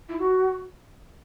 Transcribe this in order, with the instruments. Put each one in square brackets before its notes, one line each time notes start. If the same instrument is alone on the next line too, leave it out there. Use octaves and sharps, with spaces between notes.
[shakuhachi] E4
F#4